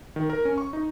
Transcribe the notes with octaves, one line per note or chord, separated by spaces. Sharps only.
D#3
A#4
C#4
C#6
D#4